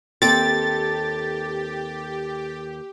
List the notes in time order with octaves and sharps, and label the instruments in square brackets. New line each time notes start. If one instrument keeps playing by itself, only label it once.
[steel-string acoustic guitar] D#2 A4 [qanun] C4 D6 [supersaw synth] G4 [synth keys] A6